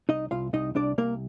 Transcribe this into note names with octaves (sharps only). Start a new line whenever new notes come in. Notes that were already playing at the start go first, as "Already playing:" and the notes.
C2 D#4 D#5
C2 F4 F5
C2 D#4 D#5
C2 D4 D5
C2 A#3 A#4